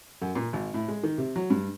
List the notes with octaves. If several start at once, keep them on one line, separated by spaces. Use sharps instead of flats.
F#2
A#2
G#1
A2
G#3
D#3
C3
F#3
G2